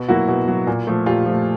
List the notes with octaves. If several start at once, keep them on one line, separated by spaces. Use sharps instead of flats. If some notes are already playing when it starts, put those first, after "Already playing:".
Already playing: B2
F#3 A#3 E4 F#4
B2
F#3 A#3
A#2
F3 A3
A#2 F4 G4
F3 A3